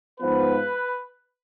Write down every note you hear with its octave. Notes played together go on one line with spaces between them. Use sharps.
G#2 F3 B3 B4